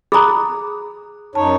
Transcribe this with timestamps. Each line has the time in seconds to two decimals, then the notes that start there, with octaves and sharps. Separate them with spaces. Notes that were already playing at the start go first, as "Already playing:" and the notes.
0.12 G#4 A#5 B5 D#6 F#6
1.35 F#2 D#4 C#5 A5